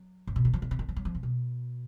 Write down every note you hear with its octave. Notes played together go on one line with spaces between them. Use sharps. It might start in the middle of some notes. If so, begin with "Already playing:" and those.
Already playing: F#3
G#2
B2
D#3
F3
D#3
C#3
D#3
F3
F#3
F3
C#3
B2